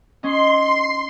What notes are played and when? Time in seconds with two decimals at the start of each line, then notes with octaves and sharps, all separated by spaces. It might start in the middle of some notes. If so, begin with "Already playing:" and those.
0.23 C#4 D#4 C6